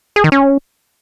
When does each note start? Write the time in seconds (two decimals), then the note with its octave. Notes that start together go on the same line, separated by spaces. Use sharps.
0.16 G#4
0.24 D#3
0.32 C#4